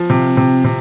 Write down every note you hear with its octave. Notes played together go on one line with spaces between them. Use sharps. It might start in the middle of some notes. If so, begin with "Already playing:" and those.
Already playing: F3
C3
C3
C3